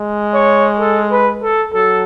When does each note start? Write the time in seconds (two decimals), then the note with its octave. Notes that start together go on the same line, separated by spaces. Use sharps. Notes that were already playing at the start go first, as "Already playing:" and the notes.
Already playing: G#3
0.34 C#5
0.80 A4
1.11 B4
1.43 A4
1.74 F#3 A4